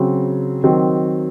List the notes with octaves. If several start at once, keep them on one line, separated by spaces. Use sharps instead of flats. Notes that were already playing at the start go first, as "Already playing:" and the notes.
Already playing: C#3 F#3 C4
D#3 F#3 C4